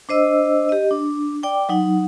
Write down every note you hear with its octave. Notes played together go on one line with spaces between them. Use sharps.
D4 C5 D#5 E6
G4 D#5
D4
D5 G5 D6
F#3 D#4 F#5